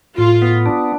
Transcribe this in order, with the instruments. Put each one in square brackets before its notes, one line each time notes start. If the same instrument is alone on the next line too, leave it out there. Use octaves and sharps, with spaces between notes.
[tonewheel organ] A2 [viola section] F4
[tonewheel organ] B3
D4